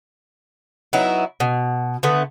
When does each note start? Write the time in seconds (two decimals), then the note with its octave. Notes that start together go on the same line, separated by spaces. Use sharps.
0.93 F#3 B3 D#4 E4
1.40 B2
2.03 D3 A3 B3